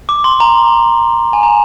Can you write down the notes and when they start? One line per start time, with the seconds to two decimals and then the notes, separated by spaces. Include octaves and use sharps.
0.09 D6
0.24 C6
0.40 A#5
1.33 G#5
1.43 A#5